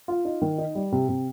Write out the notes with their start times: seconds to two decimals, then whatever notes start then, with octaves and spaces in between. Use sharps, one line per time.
0.08 F4
0.25 D#4
0.42 D#3
0.58 D#4
0.75 G3
0.92 C3
1.09 C3